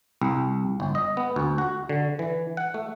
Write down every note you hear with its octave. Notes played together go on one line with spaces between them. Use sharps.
C2
G1
D#5
B3
D2
F#4
D3
E3
F#5
A3